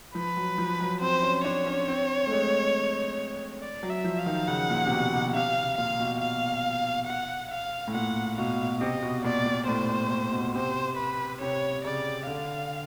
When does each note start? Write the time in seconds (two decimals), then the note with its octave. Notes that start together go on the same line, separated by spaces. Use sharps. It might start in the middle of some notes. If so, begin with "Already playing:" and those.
0.15 F3 B4
0.37 F#3
0.58 F3
0.80 F#3
1.01 C4 C5
1.23 C#4
1.44 D4 C#5
1.66 C#4
1.88 C4
2.27 A3
2.31 G#3
3.61 D5
3.83 F#3
3.90 E5
4.04 F3
4.19 F5
4.26 D#3
4.48 C#3 F#5
4.70 A#2
4.86 C3
4.91 B2
5.13 C3
5.28 B2
5.34 C3 F5
5.78 A#2 F5
6.00 B2
6.21 F5
7.07 F#5
7.51 F5
7.87 A2
7.94 A#2 F#5
8.38 B2 F5
8.81 C3 D#5
9.03 B2
9.24 A#2 D5
9.46 A#2
9.67 A2 C5
9.89 A#2
10.10 A#2
10.32 B2
10.54 C3 C5
10.97 B4
11.41 C3 C#5
11.84 C#3 D5
12.27 D3 F5